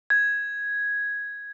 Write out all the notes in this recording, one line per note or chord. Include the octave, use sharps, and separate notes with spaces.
G#6